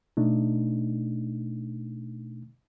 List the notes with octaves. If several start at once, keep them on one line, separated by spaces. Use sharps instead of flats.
B2 A3 D4 D#4